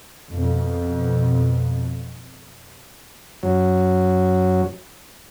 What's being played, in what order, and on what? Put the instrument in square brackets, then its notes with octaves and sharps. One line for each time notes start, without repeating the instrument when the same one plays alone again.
[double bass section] F2 B2
[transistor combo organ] F#2 F#3